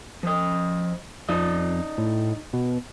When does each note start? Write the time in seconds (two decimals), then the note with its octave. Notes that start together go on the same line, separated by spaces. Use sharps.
0.23 F3 D#5
1.29 F2 D#4 D5 D#5
1.98 A2
2.53 B2